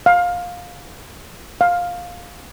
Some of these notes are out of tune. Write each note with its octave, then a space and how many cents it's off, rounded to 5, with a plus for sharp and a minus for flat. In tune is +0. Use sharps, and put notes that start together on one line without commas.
F5 +20
F5 +15